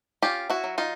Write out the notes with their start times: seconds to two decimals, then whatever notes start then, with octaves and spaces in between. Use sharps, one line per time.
0.22 C#4 F4 G4
0.50 E4 F#4
0.64 F#3
0.78 D#4 F4